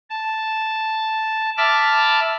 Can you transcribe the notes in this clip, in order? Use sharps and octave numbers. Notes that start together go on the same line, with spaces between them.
A5
E5 A5 B5 D6 F6